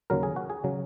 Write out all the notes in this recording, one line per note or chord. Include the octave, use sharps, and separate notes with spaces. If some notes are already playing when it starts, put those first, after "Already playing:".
D#2 C#3 F#3 A#4
G#4
F#4
G#4
C#3 F#3